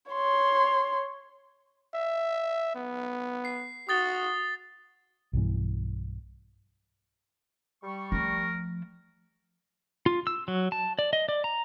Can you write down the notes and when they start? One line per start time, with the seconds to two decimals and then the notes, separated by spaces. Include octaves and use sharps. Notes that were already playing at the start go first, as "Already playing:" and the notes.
0.11 C#5 C6
1.95 E5
2.75 B3
3.45 C7
3.89 F#4 D#6 A6 G7
5.33 B1 G2 E3
7.83 G3 C#6
8.12 F3 A3 A#4
10.06 F4
10.27 E6
10.48 F#3
10.72 A5
10.99 D5
11.13 D#5
11.29 D5
11.44 A#5